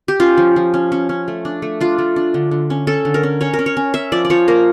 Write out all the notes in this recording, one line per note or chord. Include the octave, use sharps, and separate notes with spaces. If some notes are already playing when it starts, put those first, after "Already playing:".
G4
C#4 F4
F3
F3
C#4
C#4
C#4
A3
D4
A3
D4 F4
A3
D4
D3
D3
C#4
C#4 A4
D3
A#4
C#4
C#4 C#5
A#4
C#4
C#5
C#4
C#4 E5
F3 D5
D5
F3 C#5
A#3 A#4